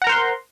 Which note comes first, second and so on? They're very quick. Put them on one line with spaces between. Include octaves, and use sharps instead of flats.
F#5 A#5 A#4 C5 C6